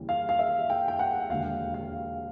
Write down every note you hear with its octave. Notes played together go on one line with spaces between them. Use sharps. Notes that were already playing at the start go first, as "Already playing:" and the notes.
Already playing: D#2 C#3 E3 G3
F5
F5
E5
G5
G5
F#5
E1 D#2 D3 F5
F5